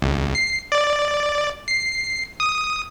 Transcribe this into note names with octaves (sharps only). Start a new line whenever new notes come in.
C#2
C7
D5
C7
D#6